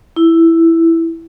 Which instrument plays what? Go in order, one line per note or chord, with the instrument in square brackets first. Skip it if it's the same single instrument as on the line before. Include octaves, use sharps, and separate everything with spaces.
[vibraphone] E4